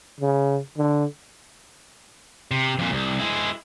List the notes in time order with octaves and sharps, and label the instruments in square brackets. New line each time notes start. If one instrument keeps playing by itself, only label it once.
[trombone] C#3
D3
[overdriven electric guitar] C3
F2 A#2
C2
G#3 E4